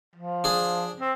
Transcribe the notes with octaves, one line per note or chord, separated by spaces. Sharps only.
F3
D4 G#4
C4